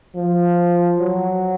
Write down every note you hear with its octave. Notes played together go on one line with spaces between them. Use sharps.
F3
F#3